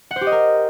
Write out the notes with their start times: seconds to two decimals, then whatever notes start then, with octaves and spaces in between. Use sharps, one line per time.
0.11 F#5
0.16 C5
0.21 G4
0.27 D#5
0.32 A#4